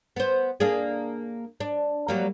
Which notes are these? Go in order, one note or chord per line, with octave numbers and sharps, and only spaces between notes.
B3 C5
A#3 D4 G#4
D4
F#3 G3 A#3